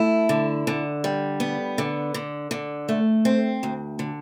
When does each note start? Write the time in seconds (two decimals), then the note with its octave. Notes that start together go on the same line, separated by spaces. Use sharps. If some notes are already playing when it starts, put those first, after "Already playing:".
Already playing: A3 E4
0.29 D3
0.67 D3
1.04 G3
1.40 B3
1.78 D3
2.14 D3
2.51 D3
2.89 A3
3.25 C4
3.63 D2
3.99 D3